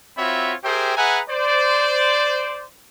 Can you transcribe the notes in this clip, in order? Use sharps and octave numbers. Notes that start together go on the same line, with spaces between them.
C4 F4 F#4 C#5 E5 B5
G4 G#4 A#4 C5 E5 G5
G#4 B4 E5 F#5 G#5 A#5
C5 D5